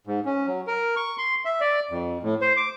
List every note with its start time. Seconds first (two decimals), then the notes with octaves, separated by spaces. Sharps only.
0.07 G#2
0.25 C#4
0.47 F#3
0.67 A#4
0.96 C#6
1.18 C6
1.45 E5
1.61 D5
1.91 F2
2.23 A2
2.41 C5
2.57 D6